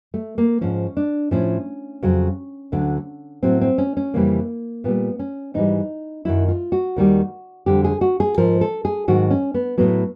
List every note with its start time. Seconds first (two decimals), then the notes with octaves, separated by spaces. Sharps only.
0.14 A3
0.38 A#3
0.61 G#2 F3 C#4
0.97 D4
1.31 A2 F3 C#4
2.03 F2 C#3 F#3
2.72 D2 D3 F#3
3.43 A2 F#3 C4
3.61 C4
3.78 C#4
3.97 C#4
4.14 F2 C#3 E3 G3 A#3
4.84 A#2 G3 B3
5.19 C#4
5.54 G#2 E3 G3 D#4
6.25 F#2 D#3 F#3 E4
6.48 F4
6.72 F#4
6.96 D#2 D#3 G3
7.66 F2 D3 G3 G4
7.84 G#4
8.01 F#4
8.20 G#4
8.38 G#2 F3 A#4
8.61 A4
8.85 G#4
9.08 G#2 D#3 F#3 F#4
9.31 C#4
9.54 B3
9.78 A2 F#3 B3